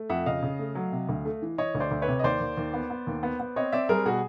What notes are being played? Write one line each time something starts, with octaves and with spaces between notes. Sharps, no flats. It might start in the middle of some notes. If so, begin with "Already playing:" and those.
Already playing: A3
F2 E5 F#5
C#3 D#5 F5
C#3
A3
F#3
C3
D2
A3
E3
E3 C#5 D#5
D2
C5 D5
D2
B4 C#5
C3
D#5
D#2 C5 D5
D#2
D#2
B3
B3
D#2
B3
B3
C4 C#5 D#5
C4 D5 E5
G3 G#4 A#4
B2 F#4 G#4